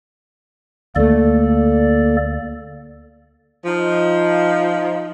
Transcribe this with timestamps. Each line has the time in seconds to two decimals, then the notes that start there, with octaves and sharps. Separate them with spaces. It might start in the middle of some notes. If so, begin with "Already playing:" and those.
0.96 D2 A3 A#3 A4 D5
3.65 F3 D#4